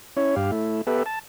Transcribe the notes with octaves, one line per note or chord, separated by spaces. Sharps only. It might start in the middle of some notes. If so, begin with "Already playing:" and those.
C#4 E4 C#5
G2 G4 F5
A3 E4
B3 G4 A4 B4 E5
A5